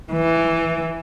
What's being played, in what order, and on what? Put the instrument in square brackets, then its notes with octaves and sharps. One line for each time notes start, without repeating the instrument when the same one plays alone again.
[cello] E3